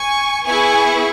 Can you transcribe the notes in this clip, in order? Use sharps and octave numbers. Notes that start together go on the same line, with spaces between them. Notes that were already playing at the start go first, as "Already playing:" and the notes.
Already playing: G#5 C#6
B3 E4 G#4 G#5 C#6